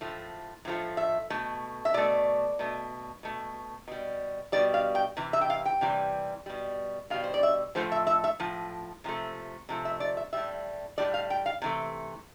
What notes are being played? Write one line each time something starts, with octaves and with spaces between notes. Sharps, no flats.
A2 F3 A3
A2 F3 A3
E5
B2 A3
E5
B2 A3 D5
B2 A3
B2 A3
B2 G3
B2 G3 D5
F5
G5
C3 E3
E5
G5
F5
G5
C3 E3 G3
B2 G3
B2 G3 F5
C5
D5
E5
A2 F3 A3 C5
E5
E5
E5
A2 F3
C3 F3 A3
C3 F3 A3
E5
D5
E5
A2 G3 E5
A2 G3 D5
F5
G5
F5
C3 E3 A3